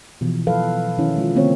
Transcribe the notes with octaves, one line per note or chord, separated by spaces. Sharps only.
B2 E3 F3
F3 F#3 A4 B4 F5
D#3 C#4 E4
G#3 F4
D3 A3 A#3 C4 C#5